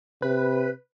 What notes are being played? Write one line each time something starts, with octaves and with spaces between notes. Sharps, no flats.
C3 B4